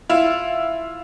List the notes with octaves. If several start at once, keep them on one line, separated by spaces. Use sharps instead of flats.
E4 F4